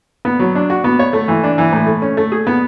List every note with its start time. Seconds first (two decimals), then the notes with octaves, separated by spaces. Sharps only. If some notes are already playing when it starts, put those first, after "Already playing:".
0.25 B3
0.39 F#3
0.55 D4
0.70 F#4
0.84 B3
0.99 C#5
1.13 A3
1.28 E3
1.44 D4
1.58 E3
1.72 A2
1.87 A3
2.02 C#4
2.17 A3
2.32 G#4
2.47 B3